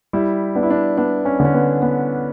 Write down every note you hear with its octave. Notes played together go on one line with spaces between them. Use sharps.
G3 E4
B3 D4
E4
D4
B3 D4
C#4
D3 C#4
B3
B3